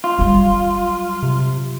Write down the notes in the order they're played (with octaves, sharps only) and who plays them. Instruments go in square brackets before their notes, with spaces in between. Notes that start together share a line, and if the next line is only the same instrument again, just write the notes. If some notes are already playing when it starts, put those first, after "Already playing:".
[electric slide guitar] F4
[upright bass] F#3 G3
[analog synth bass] C3